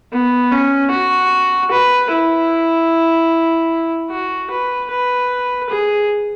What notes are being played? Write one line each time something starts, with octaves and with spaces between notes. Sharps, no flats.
B3
C#4
F#4
B4
E4
F#4
B4
B4
G#4